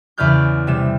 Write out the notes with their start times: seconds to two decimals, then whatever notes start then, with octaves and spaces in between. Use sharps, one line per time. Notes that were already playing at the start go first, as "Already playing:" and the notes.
0.18 E2 C#3 B4 D5 F6 G6
0.67 C3 G3 E7